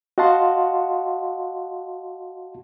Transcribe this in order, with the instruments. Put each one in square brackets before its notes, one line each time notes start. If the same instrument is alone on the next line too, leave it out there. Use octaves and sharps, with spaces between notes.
[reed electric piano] F#4 D#5 F5 F#5 A5 C6